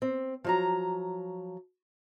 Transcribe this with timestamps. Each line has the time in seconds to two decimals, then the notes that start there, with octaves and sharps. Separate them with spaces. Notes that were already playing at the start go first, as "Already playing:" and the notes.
0.02 C4
0.44 F3 F#3 A#5